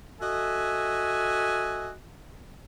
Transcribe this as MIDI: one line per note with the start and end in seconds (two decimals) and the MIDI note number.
0.21 1.92 66
0.21 1.92 69
0.21 1.92 75
0.21 1.92 76
0.21 1.92 80